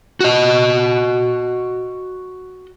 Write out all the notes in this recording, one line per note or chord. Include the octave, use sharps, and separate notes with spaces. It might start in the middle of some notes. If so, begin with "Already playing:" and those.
F#4 D#5